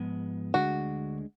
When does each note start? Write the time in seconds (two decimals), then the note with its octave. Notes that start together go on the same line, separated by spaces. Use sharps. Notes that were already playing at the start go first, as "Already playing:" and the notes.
Already playing: G#2 F3 G#3 B3
0.54 D2 D3 G#3 D4 F#4